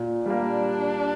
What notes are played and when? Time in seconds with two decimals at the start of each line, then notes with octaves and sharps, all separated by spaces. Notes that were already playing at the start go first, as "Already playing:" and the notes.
Already playing: A#2
0.26 G3 A#3 D4